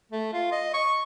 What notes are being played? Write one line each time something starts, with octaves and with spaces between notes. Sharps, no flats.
A3
F4
D#5
C#6